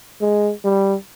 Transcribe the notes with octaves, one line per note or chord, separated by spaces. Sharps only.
G#3
G3